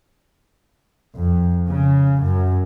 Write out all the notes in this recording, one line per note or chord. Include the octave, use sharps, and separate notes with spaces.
F2
C#3
F#2